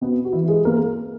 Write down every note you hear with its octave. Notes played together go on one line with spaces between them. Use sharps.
B2 B3
F#4
E3 E4
G#3 G#4
A#3 A#4